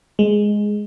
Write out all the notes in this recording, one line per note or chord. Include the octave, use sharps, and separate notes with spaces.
G#3